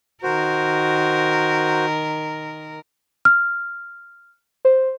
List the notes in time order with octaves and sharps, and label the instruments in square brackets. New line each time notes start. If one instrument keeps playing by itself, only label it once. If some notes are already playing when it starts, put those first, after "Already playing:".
[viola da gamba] D#3 A#4 [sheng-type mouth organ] F#4 C5
[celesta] F6
[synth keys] C5